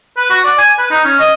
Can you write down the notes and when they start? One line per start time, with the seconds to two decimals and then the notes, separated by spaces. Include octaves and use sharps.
0.17 B4
0.30 F#4
0.44 D5
0.58 G#5
0.78 B4
0.91 D#4
1.04 C#4
1.19 D#5